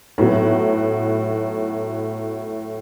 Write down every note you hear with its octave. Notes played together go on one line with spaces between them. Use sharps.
A2 F#3 B3 F#4